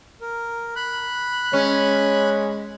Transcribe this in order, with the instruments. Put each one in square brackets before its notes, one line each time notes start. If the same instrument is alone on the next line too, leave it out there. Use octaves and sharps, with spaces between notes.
[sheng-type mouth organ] A#4
B5 F#6
[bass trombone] G#3 [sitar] C#4 [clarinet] C#5